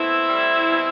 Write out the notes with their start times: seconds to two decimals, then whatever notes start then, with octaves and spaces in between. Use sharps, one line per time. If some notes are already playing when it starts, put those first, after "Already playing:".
Already playing: B2 A3 C4 E4
0.28 A2 G3
0.66 B2 G3